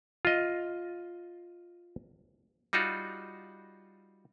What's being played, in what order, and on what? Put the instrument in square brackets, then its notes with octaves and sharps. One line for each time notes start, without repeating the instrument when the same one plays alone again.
[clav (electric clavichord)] F4 D#5
G3 D#4 F4 F#4